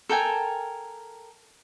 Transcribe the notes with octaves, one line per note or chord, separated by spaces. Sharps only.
A4 A#4 G5 G#5